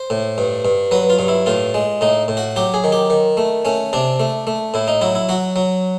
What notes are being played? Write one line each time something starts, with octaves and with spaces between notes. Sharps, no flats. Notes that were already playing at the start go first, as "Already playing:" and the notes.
Already playing: C5
A2
G2
G2
F#3 B4
F4
G2
E4
A2 F4
G#3
A2 D#4
A2
F#4
F#3 G4
G#4
D#3
G4
D#3
A3
A3 C#4
C3 D4
A3
A3
A2 E4
D#4
F#3 E4
E4
F#3 F#4
F#3